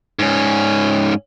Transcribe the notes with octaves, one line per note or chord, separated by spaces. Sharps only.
G#2 C#4